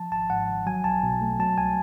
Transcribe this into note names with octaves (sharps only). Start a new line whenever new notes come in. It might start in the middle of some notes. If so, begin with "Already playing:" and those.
Already playing: F3 A5
G#1 A5
G#2 F#5
G#1
F#3 G#5
B1 A5
B2
A3
F#3 A5
C2 G#5